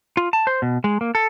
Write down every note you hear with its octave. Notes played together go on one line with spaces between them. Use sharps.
F4
A5
C5
B2
G#3
A#3
A4